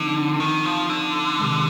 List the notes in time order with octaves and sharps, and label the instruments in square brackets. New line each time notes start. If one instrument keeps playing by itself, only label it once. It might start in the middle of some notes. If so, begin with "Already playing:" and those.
Already playing: [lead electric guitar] D3 [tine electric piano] F3 C4 D#4
[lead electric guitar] D#3
F3
D3
[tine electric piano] C3 D#3 G#3